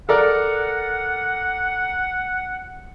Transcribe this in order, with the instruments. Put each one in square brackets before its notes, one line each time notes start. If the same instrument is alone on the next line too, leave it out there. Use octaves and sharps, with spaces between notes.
[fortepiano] A4 A#4 D5 [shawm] F#5